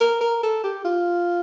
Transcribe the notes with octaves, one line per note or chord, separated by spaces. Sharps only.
A#4
A#4
A4
G4
F4